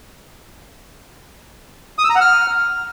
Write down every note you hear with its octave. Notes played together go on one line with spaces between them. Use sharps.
D#6
E6
A#5
F#5
F6